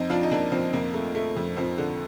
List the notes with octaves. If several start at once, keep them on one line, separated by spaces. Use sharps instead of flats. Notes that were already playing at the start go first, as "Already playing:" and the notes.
Already playing: F2 C4 D#4
F3 D4 F4
D#4
F2 A#3 D4
F3 C4
F2 A#3
A3
A3
F2
F3 C4
D3